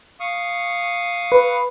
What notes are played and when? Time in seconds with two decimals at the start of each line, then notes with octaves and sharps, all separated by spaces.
0.20 F5 C#6 D#6
1.32 B4